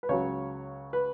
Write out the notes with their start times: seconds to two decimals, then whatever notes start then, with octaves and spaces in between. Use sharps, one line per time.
0.03 B4
0.09 C#2 C#3 F#3 C#5
0.93 B4